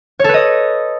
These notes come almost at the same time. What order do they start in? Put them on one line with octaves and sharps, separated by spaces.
C#5 A4 B4 D#5